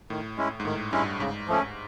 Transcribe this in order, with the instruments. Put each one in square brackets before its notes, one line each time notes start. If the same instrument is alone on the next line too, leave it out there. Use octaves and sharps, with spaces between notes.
[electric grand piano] A2 [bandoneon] D#3
[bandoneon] G#3 C#4 E4
[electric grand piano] G#2
[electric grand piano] A2 [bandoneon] D#3
[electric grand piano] G2 [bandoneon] G#3 C#4 E4
[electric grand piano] G#2 [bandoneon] C#3
[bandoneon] F3 A3 C#4